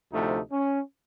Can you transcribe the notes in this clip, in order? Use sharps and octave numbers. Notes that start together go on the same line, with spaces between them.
D2 C3 F3 A3 D#4
C#4